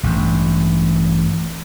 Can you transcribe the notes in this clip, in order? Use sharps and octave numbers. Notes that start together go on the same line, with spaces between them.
A1 G2